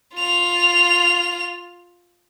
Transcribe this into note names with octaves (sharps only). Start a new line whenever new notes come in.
F4 F7